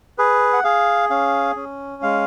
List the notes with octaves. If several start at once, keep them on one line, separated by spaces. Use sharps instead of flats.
G#4 B4
F#5
G#4 F5
C#4 F5
C#4
G#3 F5